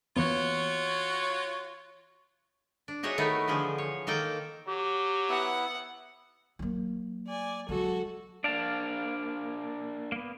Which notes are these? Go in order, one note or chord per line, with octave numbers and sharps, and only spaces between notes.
E3 A#3 B3 F4 F#4 C#5
D4
D#4 F#4 G#4 C#5 D#5 E5
D#3 A3 B3 D#4 E4
D3 E3 F3 G#4
C#5
D#3 A#3 A4 G5 A5
F#3 G4
B3 E4 F#5
F#3 A#3
D5 G#5
F#3 G#3 F#4 A4
A#3 D4 D5 F5 A5
A#3 B3